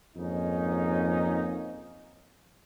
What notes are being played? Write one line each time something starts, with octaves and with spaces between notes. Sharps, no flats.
F2 G#2 A#3 C#4 D#4